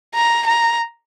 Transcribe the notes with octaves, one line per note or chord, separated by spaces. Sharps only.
A#5
A#5